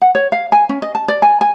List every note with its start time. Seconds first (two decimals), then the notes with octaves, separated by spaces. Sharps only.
0.02 F#5
0.15 C#5
0.32 F5
0.52 G#5
0.69 C#4
0.82 D#5
0.95 A5
1.08 D5
1.22 G#5
1.41 G#5